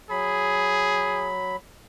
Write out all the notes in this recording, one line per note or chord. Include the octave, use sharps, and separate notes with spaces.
F#3 G#4 B5